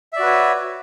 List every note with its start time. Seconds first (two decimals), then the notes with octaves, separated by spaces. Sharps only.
0.13 E5
0.16 D5
0.19 F#4
0.23 B4
0.26 C#5